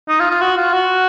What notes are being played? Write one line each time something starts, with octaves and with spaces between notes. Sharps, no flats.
D#4
F4
F4
F#4
F4
F#4